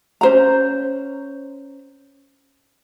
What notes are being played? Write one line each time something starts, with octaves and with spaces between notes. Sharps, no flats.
C#4 C5 A#5